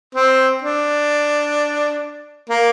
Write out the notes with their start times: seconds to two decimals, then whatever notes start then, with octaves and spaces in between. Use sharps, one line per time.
0.15 C4
0.62 D4
2.49 A#3